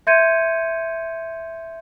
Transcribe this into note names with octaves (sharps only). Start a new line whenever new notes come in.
E5 C6 G6 G#6 C#7 D#7